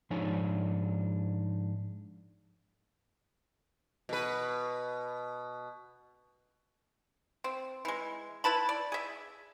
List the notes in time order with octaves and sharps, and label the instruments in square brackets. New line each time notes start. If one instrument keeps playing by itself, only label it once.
[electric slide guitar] G#2 F3 D4 D#4 C#5 G#5
[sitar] B2 B4
[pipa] C4
E3 G#3
E4 B4 A5 B5
D5
G#4 E5